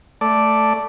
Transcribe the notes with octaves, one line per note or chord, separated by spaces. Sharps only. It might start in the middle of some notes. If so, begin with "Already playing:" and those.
A3 D5